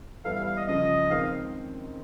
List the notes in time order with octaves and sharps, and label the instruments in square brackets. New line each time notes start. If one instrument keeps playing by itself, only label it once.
[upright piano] E3 G3 B3 E4 A4 [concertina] F5
[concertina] F5
F5
D#5
[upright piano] C#2 C#3 F3 [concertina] D#5
[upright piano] D#3 G#3 C4 [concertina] F5